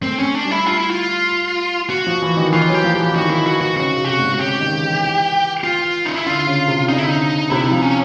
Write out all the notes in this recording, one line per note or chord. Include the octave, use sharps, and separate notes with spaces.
A3 C4
C#4
D4
G3
E4
F4
E4
F4
F#4
F3
E3
D#3
E3 F4
F#3
G4
F3
E3 G4
D#3 F#4
E4
F#4
F#4
C#3 F#4
C3
G4
F#4
G#2
F#4
C#3 G4
D#3
E3
F4
D#4
E4
D3 F4
C#3
C3
D3 D#4
E4
D#4
C3 E4
D#4
F3
C#4